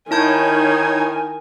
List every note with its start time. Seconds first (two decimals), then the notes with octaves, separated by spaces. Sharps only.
0.11 D#3 D#4 E4 C#5 G#5 A5 G6